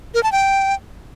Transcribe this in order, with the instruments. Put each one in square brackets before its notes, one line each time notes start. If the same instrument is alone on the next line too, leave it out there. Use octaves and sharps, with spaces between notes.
[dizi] A#4
A5
G5